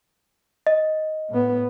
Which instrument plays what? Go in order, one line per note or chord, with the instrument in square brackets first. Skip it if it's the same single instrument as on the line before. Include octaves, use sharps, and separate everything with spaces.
[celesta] D#5
[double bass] A2 B3